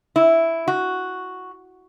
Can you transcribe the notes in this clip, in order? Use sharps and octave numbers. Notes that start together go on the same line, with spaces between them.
E4
F#4